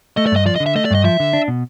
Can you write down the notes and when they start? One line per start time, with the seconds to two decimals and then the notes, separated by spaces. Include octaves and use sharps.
0.17 A3 D#5
0.27 D5
0.32 G2 D#5
0.46 F3 D5
0.56 D#5
0.60 D3
0.66 E5
0.75 A3 D#5
0.85 D5
0.91 G2 D#5
1.04 F3 E5
1.20 D3
1.33 D4
1.48 B2